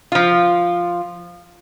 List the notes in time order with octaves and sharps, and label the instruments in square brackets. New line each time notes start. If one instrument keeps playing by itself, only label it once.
[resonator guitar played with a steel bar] F3 F4